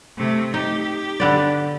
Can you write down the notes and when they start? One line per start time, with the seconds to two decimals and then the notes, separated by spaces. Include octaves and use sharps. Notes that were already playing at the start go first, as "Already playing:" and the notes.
0.18 C3 A3
0.54 D#4 G4
1.20 D3 B3 D5